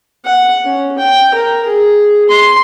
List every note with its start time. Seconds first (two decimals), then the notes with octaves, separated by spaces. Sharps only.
0.25 F#5
0.64 C#4
0.98 G5
1.34 A#4
1.65 G#4
2.29 C6